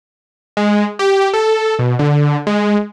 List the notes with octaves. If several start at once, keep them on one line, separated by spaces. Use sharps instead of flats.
G#3
G4
A4
B2
D3
G#3